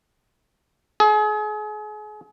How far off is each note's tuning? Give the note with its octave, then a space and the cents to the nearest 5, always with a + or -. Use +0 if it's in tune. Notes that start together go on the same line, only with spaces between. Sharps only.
G#4 +35